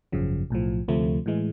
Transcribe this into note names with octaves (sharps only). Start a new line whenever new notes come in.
G#1 F#2 C#3 F3
B1 A2 F3
D2 C3 F3 A3
A2 E3 G#3